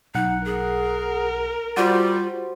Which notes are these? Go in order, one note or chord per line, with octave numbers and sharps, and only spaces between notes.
B1 D#4 F#5
G#4 A#4
G3 F4 F#4 C5